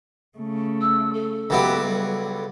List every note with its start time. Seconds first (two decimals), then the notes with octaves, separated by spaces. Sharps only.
0.38 C#3 A3
0.81 E6
1.13 A4
1.50 C#2 F#3 B3 G4 E5
1.81 G3